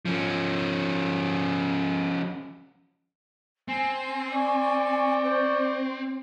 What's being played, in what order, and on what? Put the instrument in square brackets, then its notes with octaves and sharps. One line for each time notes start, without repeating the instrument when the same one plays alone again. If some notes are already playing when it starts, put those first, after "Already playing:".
[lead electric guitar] F3 C#4
[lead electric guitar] C4 [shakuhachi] G#5
[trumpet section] D5 C#6
[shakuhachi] C5